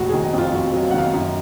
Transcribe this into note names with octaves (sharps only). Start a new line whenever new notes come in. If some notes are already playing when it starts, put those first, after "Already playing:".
Already playing: F1 A#1 F#4
D#3 G#4
D#5
F2 F4
F2 F#4
F#3
F5
F#5
D#3 F5
F#2 F5